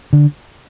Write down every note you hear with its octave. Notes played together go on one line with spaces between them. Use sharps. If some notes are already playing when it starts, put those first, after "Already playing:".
D3